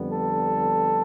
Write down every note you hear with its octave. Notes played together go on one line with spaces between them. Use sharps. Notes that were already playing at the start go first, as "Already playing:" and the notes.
Already playing: F2 D3 G3 B3
A4